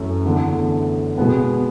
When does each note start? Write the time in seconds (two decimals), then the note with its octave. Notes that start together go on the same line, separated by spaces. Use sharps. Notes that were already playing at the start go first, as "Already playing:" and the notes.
Already playing: F#2 E3 A3 C#4
0.25 E2 D3 A3
1.18 B2 G#3 B3